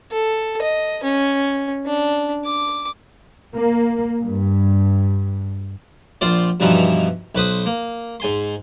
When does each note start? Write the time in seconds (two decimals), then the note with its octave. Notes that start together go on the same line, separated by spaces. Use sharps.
0.12 A4
0.62 D#5
1.03 C#4
1.86 D4
2.45 D6
3.55 A#3
4.23 G2
6.21 A#1 F4 C5 D5
6.60 G2 B2 E3 F3 D#4 E4
7.35 B1 B4 C5 D#6
7.66 A#3
8.20 G#2 G#5 C6